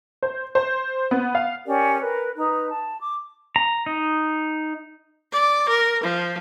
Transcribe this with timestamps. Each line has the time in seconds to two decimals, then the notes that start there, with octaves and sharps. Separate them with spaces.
0.23 C5
0.55 C5
1.11 B3
1.35 F5
1.65 C#4 G4 A#4 D5
2.00 A#4 B4
2.37 D#4 B4 A#5
2.70 A5
3.00 D6
3.56 A#5
3.86 D#4
5.32 D5
5.68 A#4
6.03 F3